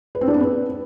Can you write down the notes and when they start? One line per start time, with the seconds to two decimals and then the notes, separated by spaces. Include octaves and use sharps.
0.15 B4
0.21 C4
0.28 D4
0.34 B3
0.41 B4